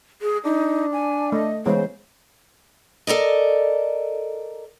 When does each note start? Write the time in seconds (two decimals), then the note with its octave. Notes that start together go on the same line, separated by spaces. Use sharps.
0.22 G#4
0.45 D4 D#4
0.92 G#5
1.32 A3 D#5
1.66 C#3 E3 G#3 B3 C5
3.07 A4 A#4 D5 D#5